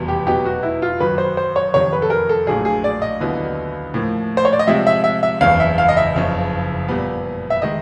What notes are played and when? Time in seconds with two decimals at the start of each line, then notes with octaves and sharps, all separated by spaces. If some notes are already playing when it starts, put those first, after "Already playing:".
Already playing: F1 E2 B2 G3 B3
0.08 G4
0.26 B2 F#3 B3 D#4 G4
0.45 F#4
0.63 E4
0.82 F4
1.00 F#2 D#3 F#3 B4
1.18 C5
1.37 C5
1.56 C#5
1.74 F2 C3 D#3 C#5
1.93 B4
2.02 A4
2.10 A#4
2.29 A4
2.47 A#1 A2 F#3 A#3 D4 G#4
2.65 G#4
2.84 D5
3.02 D#5
3.20 D#2 D3 F#3 B3 E4
3.94 A2 F3 A#3
4.37 C5
4.45 C#5
4.53 D5
4.59 D#5
4.67 C3 F3 G#3 C4 E5
4.87 E5
5.04 E5
5.23 E5
5.41 F#1 E2 C#3 F5
5.60 E5
5.78 F5
5.89 D#5
5.97 E5
6.15 F#1 F2 C#3
6.88 A#2 G3 B3
7.50 E5
7.62 D#3 G#3 D#5